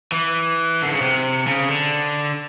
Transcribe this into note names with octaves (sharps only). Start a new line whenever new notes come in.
E3
D3
C#3
C3
C#3
D3